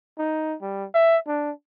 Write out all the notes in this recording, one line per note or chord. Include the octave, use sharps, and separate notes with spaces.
D#4
G3
E5
D4